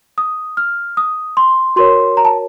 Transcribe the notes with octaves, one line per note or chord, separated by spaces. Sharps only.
D#6
F6
D#6
C6
F#4 A#4 C#5 C6
A#5
A5